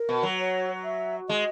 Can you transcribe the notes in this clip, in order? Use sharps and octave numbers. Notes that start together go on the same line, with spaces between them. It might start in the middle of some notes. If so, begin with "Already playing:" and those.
Already playing: A#4
B2
F#3
C#5
E5
G#3 D#5